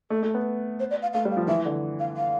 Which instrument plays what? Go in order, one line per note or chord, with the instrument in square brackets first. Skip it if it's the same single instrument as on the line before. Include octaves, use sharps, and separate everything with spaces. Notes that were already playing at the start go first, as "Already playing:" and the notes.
[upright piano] A3 [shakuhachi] A4
[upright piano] A3
B3
[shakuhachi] C5
D5
F5
[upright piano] A3 [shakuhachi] F5
[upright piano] G3
[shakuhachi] F5
[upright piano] F3
[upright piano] E3 [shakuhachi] E5
[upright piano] D3
[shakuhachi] F5
F5